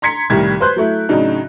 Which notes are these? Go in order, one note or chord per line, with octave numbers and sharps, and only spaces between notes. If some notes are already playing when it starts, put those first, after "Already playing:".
A#5 C6 G#6 B6 C#7
C2 A2 D#3 G3 G#6
B4 C5 C6 F#6 G6
F#3 A3 E4
A2 C#3 F#3 D4 D#4